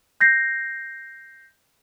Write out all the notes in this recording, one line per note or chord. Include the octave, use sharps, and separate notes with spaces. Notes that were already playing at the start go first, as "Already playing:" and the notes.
G6 A#6 C7